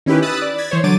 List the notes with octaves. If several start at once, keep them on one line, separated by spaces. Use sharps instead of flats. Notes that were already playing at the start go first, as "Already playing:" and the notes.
D#3 C#4 E4 G4 B4
B5 D#6 E6 F#6 A6
D5
G#6 A6 B6
E3 C5 C#5
D3 F#3 D6 A6 D7 D#7